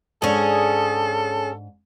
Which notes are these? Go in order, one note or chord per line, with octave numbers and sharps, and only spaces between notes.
G#2 C#4 D4 G#4 A4